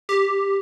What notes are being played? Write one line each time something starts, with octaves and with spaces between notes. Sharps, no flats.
G4